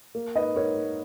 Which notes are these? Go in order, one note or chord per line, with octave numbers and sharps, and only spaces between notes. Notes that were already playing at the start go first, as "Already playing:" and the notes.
A#3
G#2 B4 D#5
G#2 A#4 C#5
A#3